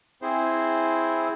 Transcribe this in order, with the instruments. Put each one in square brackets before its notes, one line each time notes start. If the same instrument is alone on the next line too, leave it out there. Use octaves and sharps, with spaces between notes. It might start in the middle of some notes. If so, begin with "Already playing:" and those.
[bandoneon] C4 E4 G#4 C5